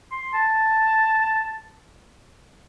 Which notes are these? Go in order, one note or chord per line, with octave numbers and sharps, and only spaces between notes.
C6
A5